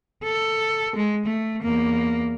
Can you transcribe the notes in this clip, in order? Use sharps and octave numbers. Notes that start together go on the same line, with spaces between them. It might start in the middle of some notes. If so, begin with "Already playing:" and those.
A4
G#3
A3
E2 A#3